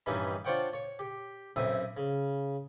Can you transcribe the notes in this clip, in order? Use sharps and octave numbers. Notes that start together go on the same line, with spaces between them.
G2 D#3 E3 G3 C#4
D4 F4 C5 C#5 F#5 G5
C#5
G4
B1 F#2 C4 E5 D#6
C#3